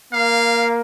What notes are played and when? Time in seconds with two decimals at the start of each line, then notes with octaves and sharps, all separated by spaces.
0.13 A#3 F5